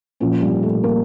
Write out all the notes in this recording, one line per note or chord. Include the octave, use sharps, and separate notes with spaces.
A#2 F3 C#4
G3
A3
A#3